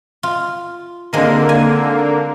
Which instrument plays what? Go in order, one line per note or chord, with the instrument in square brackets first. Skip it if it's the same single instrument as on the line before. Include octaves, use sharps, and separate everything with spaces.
[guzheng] F4
[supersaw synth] D3 A#3 [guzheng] D#3 G#3 C4
[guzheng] G#5